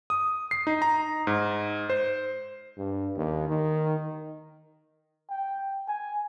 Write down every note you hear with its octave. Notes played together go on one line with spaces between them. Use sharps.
D#6
C7
D#4
A#5
G#2
C5
G2
D#2
D#3
G5
G#5